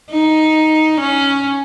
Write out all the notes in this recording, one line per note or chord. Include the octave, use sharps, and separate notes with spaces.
D#4
C#4